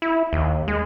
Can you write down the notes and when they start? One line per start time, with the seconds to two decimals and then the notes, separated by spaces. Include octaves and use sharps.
0.02 E4
0.33 D#2
0.68 G#3